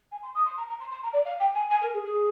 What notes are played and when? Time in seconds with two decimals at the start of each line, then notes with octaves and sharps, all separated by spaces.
0.11 G#5
0.22 C6
0.35 D#6
0.45 C6
0.57 A#5
0.68 A#5
0.80 C6
0.91 C6
1.03 A#5
1.13 D5
1.25 F5
1.40 G5
1.55 G#5
1.70 G#5
1.81 A#4
1.93 G#4
2.04 G#4